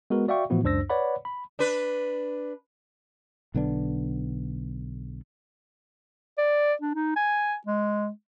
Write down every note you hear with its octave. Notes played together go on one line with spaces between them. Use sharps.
G#3 B3 F#4 A#4
F#4 D5 E5 F5 G5 C#6
A2 E3 F3 B3 E4 F#4
C#2 F#2 D4 C5 E6 A#6
B4 C#5 D5 F#5 B5
B5
D4 B4
B1 D3 B3 D4
D5
D4
D#4
G#5
G#3